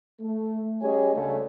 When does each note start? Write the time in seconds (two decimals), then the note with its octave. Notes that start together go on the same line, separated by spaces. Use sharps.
0.21 A3
0.82 G3 C#4 G#4 C#5 D#5 G#5
1.14 D2 C#3 A3